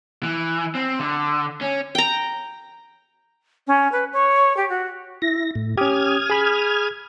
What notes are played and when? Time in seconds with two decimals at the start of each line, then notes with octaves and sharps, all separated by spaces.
0.23 E3
0.75 C4
0.99 D3
1.61 C#4
1.95 G5 A#5
3.67 C#4
3.92 B4
4.13 C#5
4.57 G4
4.69 F#4
5.22 E4 A#6
5.55 A2
5.77 C#4 G4 D#6 F6 G#6
6.30 G#4 B5